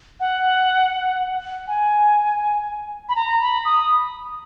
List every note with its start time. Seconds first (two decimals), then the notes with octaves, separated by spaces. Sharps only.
0.20 F#5
1.67 G#5
3.09 B5
3.16 A#5
3.41 B5
3.65 D#6